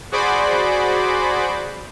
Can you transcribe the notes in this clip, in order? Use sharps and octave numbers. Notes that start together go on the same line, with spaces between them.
F#4 G#4 C5 D5 B5 D6